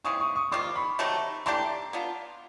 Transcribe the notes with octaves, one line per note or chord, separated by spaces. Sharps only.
C#3 E3 G#3 C4 C#6 D#6
C#6 D#6
C#6 D#6
D#3 G3 C4 F4 C6 D6
B5 C#6
C3 D#3 F#3 A3
E3 A3 D4 G4 A#5 C6
B3 D4 F4